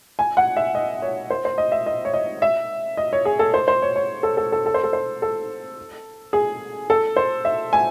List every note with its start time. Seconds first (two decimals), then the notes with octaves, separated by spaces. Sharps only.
0.19 G#5
0.37 F#5
0.57 E5
0.75 D#5
1.02 C#5
1.30 C5
1.45 C5
1.58 D#5
1.72 E5
1.86 D#5
2.05 C#5
2.14 D#5
2.42 E5
2.97 D#5
3.13 C#5
3.25 G#4
3.39 A4
3.54 C5
3.68 C5
3.82 C#5
3.96 C#5
4.23 A4
4.37 A4
4.52 A4
4.66 A4
4.74 C5
4.83 A4
4.93 C5
5.22 A4
6.33 G#4
6.90 A4
7.16 C5
7.45 E5
7.73 G#5